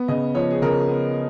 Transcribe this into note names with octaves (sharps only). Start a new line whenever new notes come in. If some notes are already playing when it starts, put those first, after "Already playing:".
Already playing: B3
C#3 D#5
F3 C#5
G#4
C#3 A#4
B3